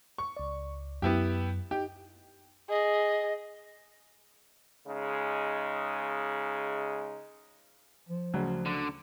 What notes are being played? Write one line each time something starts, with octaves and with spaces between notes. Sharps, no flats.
C#6
C#2 D5
F#2 B3 E4 G4
D#4 G4
G#4 D#5
C#3 G#3 D#4
F3
D2 C#3 F#3
D3